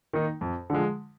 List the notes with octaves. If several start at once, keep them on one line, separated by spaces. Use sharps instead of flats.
D#3 A#3 D#4
F2
D3 F3 G#3